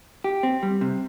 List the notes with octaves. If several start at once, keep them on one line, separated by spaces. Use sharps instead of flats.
G4
C4
G3
C3